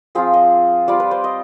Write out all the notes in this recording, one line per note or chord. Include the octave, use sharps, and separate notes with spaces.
F3 C4 F4 G#4
D#5
G3 C4 F4 D5
B4
C5
D#5